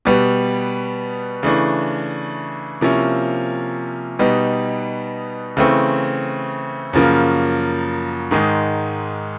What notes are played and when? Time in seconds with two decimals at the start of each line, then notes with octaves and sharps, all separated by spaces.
0.05 B2 G3 B3
1.43 C#3 E3 A3 D4
2.81 C3 F3 A#3 C#4 E4
4.19 B2 G3 B3 D#4
5.57 C#3 E3 A3 C4
6.93 F#2 C#3 F3 A#3
8.31 G#2 D#3 G#3